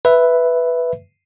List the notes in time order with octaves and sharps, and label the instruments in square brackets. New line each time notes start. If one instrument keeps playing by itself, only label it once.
[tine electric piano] B4 E5